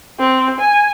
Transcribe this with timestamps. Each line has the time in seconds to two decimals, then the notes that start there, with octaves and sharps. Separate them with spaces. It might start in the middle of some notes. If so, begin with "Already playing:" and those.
0.19 C4
0.60 G#5